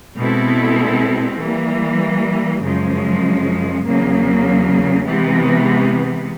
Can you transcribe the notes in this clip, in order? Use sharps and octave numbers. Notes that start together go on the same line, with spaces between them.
B2 G#3 C4 E4 A4
E3 G3 A#3
F#2 C#3 F3 G#3
E2 C#3 F#3 A#3
C3 E3 G#3 B3